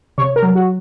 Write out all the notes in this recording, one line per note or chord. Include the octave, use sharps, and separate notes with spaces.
C3 C#5
A#4
F#3
F#4